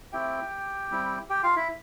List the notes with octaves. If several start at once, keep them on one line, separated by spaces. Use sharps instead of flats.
A3 C4 E4 G4 G5
G3 C4 E4
G4 G5
F4 F5
E4 E5